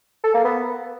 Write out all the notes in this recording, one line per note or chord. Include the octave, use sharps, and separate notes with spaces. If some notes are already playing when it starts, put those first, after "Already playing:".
A4
A#3
B3